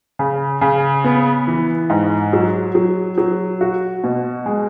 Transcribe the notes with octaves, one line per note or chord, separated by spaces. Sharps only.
C#3
C#3
B3
E3
G#2
F#3
F#3
F#3
F#4
B2
G#3